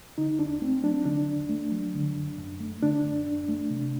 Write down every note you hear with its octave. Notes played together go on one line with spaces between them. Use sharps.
D3 D#4
D#2 D4
A3 C4
F#3 D4
D3 D4
D#2
A3
F#3
D3
F#2
F#2
A3
D3 D4
F#2
F#2
A3
C3